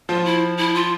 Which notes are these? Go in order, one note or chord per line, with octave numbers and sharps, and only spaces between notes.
F3 F4
E4
E4
F4